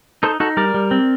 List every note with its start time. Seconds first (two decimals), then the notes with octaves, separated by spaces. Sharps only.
0.23 D#4 A4 C5
0.40 D#4 F#4 A4
0.57 G3 A#4 D5
0.74 G3
0.91 C4